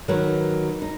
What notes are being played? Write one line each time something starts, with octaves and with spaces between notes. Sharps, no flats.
D#3 F#3 D#4 B4
D#4